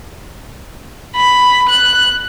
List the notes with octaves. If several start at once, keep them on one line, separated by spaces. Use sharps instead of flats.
B5
F#6